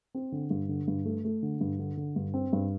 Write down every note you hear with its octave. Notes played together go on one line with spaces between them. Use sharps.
C4
D3
G2
D3
G2
A3
A3
D3
G2
D3
D3
G2
C4
G2